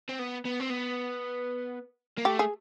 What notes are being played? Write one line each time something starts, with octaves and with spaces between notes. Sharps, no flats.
C4
B3
B3
C4
B3
A#3
A3 G4
G#4